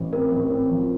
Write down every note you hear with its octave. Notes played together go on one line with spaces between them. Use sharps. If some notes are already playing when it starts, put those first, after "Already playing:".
Already playing: A1
C4 A#4
A1
C4
F3